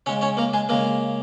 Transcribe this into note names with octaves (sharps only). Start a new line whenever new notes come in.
C#3 G#3 C#4 C#5
C#4 C#5
A#3 A#4
G#3 G#4
C#3 G#3 A#3 A#4